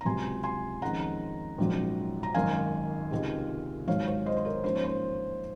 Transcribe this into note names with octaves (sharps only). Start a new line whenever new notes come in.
A#5
C#2 C3 F#3 G#5 C6
G#5 C6
F2 D#3 G#3 C#4 F#5 A#5
A#1 G#2 F#3 C#4
A#5
G#1 F#2 D#3 F5 G#5
C#2 C3 D#3 G#3
G#1 G#2 F#3 C#5 F5
C#5 F5
C5 D#5
C5
A#4 C#5
G#2 F3 A#3 C#4 C5
C#5
C5